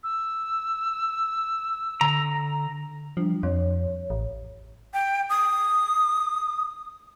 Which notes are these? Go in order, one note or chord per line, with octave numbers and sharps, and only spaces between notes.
E6
D3 A#5
F3 G3 D4
F2 C#5
A1
G5
D#6